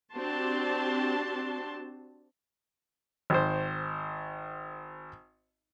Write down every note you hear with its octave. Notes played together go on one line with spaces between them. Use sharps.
C4 D4 F#4 G4 A5 C6
G#1 C5